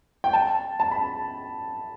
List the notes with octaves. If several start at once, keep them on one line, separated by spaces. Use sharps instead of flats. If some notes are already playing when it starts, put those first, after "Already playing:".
G5
A5
A5
B5